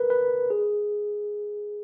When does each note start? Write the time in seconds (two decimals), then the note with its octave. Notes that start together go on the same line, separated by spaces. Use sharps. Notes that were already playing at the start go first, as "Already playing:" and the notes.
Already playing: A#4 B4
0.10 B4
0.50 G#4